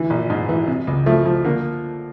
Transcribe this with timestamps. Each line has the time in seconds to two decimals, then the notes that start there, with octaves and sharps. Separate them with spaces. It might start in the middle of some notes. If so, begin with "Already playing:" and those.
Already playing: D3 E3
0.10 A#1
0.30 G#2
0.49 E3
0.68 C3
0.87 C#2
1.06 F3 A3
1.26 F3
1.45 D3 A#3